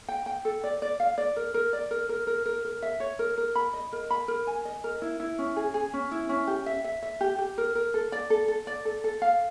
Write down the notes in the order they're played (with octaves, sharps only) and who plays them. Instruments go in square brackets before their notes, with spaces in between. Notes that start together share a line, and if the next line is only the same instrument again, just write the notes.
[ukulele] G5
G5
A4
D5
D5
F5
D5
A#4
A#4
D5
A#4
A#4
A#4
A#4
A#4
E5
C#5
A#4
A#4
B5
D#5
A#4
B5
A#4
G#5
D#5
A#4
E4
E4
C#4
G#4
G#4
C#4
E4
C#4
G4
E5
E5
E5
G4
G4
A#4
A#4
A4
D5
A4
A4
D5
A4
A4
F5